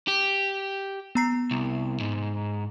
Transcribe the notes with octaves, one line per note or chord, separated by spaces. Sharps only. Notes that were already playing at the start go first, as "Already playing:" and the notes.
G4
B3 A#5 C7
C2
G#2